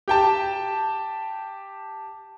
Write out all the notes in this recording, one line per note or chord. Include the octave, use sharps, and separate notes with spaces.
G4 G5 A5